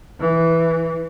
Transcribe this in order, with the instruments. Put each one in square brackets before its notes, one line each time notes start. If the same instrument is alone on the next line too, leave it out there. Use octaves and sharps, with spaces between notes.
[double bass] E3